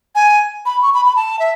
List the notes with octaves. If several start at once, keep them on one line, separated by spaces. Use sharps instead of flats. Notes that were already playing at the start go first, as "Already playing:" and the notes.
G#5
B5
C#6
B5
B5
A5
E5